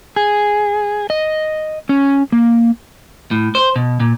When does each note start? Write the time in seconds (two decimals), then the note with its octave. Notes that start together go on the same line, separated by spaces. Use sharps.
0.16 G#4
1.10 D#5
1.89 C#4
2.32 A#3
3.31 A2
3.55 C5
3.76 B2
4.00 A#2